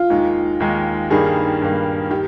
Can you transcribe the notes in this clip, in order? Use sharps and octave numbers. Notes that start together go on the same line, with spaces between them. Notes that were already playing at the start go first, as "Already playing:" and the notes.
Already playing: F4
D#2 D#3 G#3
D#2 D#3 G#3
G2 D#3 G3 A#3 G#4
G2 D#3 G3 A#3
D#3 G4